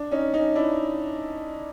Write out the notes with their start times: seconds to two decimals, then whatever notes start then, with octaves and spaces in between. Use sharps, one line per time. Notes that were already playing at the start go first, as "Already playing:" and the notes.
Already playing: D4
0.11 C#4 D#4
0.34 C#4 D#4
0.55 D4 E4